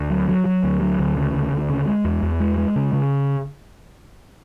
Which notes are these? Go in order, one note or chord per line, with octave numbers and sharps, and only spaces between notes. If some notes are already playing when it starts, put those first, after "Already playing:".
Already playing: D2
F#3
F#3
F#3
D2
F#3
D2
C#3
D2
D2
C#3
G#3
E2
E2
G#3
G#3
C#3
C#3